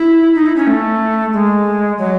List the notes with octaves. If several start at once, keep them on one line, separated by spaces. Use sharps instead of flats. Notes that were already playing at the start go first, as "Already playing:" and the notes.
Already playing: E4
D#4
E4
C#4
A3
G#3
F#3